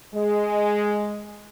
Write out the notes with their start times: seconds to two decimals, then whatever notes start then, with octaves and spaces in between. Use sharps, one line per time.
0.14 G#3